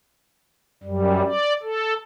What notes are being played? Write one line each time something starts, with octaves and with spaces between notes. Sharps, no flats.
F#2 G3
D5
A4